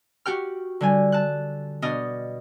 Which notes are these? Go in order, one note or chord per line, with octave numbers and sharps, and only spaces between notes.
F#4 G4 G5 F6
D3 G3 G#5
A5 F#6
B2 D4 D#5 D#6 F6